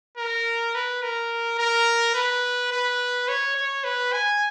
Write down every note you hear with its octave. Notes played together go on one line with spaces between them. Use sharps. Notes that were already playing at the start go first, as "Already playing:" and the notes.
A#4
B4
A#4
A#4
B4
B4
C#5
C#5
B4
G#5